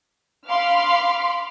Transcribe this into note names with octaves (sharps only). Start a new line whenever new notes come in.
F5 B5 C6 D6 F6